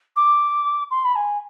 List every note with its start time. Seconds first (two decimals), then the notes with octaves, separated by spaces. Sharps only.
0.16 D6
0.90 C6
1.05 B5
1.15 G#5